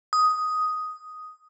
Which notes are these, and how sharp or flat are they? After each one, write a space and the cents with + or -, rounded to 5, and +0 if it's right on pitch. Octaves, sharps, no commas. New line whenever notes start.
D#6 +5